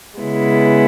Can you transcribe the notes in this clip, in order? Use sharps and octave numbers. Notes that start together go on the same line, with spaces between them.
C#3 G#3 B3 E4